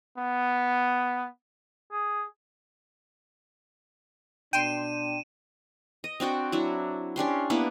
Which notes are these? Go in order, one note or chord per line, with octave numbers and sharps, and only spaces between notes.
B3
G#4
B2 D4 G5 C6 D#7 E7
D#5
C4 D4 F#4 G5
F#3 D4 E4
C#4 D4 G4 C6
A#3 B3 D4 E4